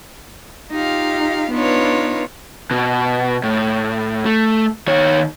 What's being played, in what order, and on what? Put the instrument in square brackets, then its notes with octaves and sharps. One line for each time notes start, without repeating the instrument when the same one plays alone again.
[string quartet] D#4 F4 G4 F5
B3 D4 D#4 F4 B4 C#5
[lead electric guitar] B2
A2
A3
D#3 C#5